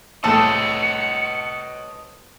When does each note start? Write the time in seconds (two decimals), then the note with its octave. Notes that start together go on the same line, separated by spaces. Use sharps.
0.24 C2 A2 A3 A4 B4 C#5 D#5 C#7